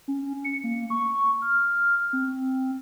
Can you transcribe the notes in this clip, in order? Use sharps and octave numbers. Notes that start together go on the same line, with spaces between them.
C#4
C#7
A#3
C#6
F6
C4